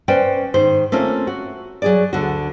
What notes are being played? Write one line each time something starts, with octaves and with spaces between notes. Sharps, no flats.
C#4 B4 C5 D5 G5
G#2 D#3 C5
A3 A#3 C4 C#4 F4
F#4
F#3 G#4 D5
D2 D3 F#4